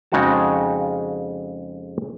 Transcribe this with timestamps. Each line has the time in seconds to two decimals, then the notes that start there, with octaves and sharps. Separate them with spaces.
0.12 F2 C#3 G#3 D#4 F#4 A5